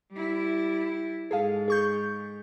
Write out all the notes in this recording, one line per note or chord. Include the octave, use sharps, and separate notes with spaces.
G3 E4
G#2 G#4 A4 F5
G#4 C#6 G6